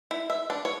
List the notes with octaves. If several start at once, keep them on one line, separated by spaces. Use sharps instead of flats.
E4
E5
D4
C#5